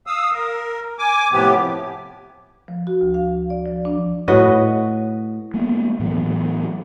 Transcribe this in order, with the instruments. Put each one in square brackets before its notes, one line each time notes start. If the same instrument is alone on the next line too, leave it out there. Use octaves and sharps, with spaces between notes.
[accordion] F5 D#6 E6
A#4
G#5 D6
A2 C3 F3 B3 G4
[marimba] F3
F#4
D2
F5
D5
F3
D4
[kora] A2 F#4 B4 D#5
[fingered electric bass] G#3 A#3 B3
A2 E3 F#3 B3